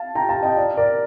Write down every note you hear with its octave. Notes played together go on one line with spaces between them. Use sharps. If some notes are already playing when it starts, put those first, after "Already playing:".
Already playing: F5 A5
G5 A#5
F5 A5
D#5 G5
D5 F5
A#4 D5